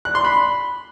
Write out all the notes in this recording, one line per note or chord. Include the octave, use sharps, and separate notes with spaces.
F#6
C6
B5